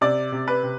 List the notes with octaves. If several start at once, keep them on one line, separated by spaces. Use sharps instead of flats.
C3 D5
C3
B4
C3